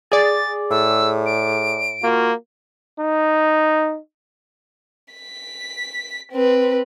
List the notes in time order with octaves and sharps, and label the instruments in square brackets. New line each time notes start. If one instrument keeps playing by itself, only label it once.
[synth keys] G#4 D5 [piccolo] A6
[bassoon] A2 [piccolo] E6
[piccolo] D7
[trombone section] A#3 F4 F#4
[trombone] D#4
[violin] B6
C4 B4